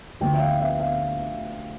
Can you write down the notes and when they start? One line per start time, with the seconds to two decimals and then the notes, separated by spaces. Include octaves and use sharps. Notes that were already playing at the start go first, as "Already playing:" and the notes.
0.21 D2 D3 F3 G5
0.34 E5
0.40 F5
0.61 E5
0.80 F5